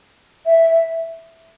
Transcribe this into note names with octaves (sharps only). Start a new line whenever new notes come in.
E5